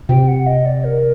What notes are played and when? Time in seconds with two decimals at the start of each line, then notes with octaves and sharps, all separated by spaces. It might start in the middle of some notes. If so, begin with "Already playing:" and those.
0.09 C3 G5
0.28 F#5
0.47 D#5
0.66 D5
0.84 A#4